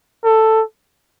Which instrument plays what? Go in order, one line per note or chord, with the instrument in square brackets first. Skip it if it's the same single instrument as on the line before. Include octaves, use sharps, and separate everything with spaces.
[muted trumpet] A4